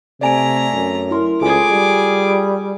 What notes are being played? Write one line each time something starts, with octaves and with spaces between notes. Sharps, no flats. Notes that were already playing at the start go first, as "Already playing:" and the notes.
C3 A3 D5 G#5 A#5 D7
F#2
E4 A#4 C6
C#2 F4 G#4 A4 G#5 D6
G3